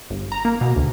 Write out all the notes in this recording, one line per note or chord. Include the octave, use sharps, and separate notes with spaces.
G1
A#5
A#3
B2
D2